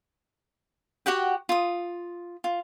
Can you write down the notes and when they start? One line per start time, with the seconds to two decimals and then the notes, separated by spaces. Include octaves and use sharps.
1.06 F#4 G4 F#5 G5
1.49 F4 D#6
2.44 F4